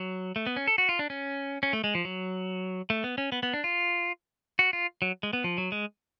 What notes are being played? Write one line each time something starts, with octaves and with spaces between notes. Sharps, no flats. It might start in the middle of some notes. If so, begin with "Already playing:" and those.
Already playing: F#3
A3
B3
C#4
A4
F#4
F4
D4
C#4
C#4
A3
G#3
F3
F#3
A3
B3
C#4
B3
B3
D4
F4
F#4
F4
F#3
G#3
B3
F3
F#3
G#3